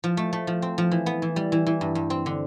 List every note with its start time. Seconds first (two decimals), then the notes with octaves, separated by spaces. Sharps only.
0.04 F3
0.17 A3
0.33 A3
0.47 F3
0.62 C4
0.78 F3
0.91 E3
1.06 B3
1.22 E3
1.36 G3
1.52 E3
1.67 E3
1.81 G2
1.95 G2
2.10 C4
2.26 D3